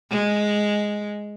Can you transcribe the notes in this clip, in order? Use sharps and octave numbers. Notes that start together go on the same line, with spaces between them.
G#3